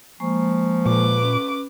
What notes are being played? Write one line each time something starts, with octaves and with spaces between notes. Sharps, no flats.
F3 G#3 A#3 C#6
A#2 B4 D6
C#4